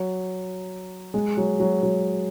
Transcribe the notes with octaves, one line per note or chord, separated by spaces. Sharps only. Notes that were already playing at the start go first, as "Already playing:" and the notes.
Already playing: F#3
G#3
F#3
F#3
F#3